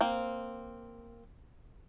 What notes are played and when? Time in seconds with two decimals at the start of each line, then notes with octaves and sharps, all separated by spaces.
0.01 A#3 C4